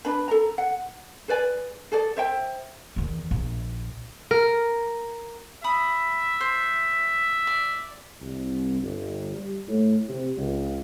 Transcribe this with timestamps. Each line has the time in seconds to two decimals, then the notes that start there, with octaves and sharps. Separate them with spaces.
0.05 D4 B4 B5
0.28 A4 A#5
0.58 F#5
1.28 G#4 B4 D5 G#5
1.92 G#4 A4 D5
2.17 C5 E5 G5
2.96 E2 D#3
3.31 A#1
4.31 A#4
5.64 E5 B5 D#6
6.41 C5
7.47 D5
8.22 C2
8.82 G1
9.35 G3
9.68 A2
10.09 C3
10.37 C#2